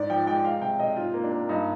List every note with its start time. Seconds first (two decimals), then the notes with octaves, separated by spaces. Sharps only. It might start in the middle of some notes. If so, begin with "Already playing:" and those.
Already playing: G#2 D5
0.10 F3 G5
0.27 G#3 G5
0.45 G#3 F5
0.62 C3 G5
0.79 C3 D#5
0.97 G#2 F4
1.14 A#3
1.24 D4
1.32 A#3
1.49 G2 D#4